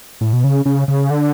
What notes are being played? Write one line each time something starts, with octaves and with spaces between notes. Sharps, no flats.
A2
B2
C#3
C#3
C#3
D3